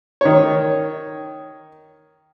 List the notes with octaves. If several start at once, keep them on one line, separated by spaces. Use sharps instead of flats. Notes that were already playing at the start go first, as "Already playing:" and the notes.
D#3 C#5